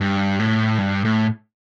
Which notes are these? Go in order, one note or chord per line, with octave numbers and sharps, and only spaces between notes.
G2
A2
G2
A2